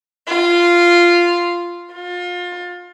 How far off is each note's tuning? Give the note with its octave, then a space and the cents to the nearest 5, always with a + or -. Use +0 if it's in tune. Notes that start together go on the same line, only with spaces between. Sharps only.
F4 -10
F4 +30